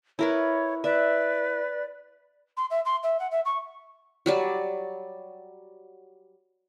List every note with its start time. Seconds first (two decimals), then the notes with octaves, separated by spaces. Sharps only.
0.19 E4 A#4 B4 C#5
0.84 B4 D5 E5
2.57 C6
2.70 E5
2.85 C6
3.03 E5
3.19 F#5
3.31 E5
3.45 C#6
4.26 F#3 G3 D5